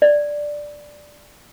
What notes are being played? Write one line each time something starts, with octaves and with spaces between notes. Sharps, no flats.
D5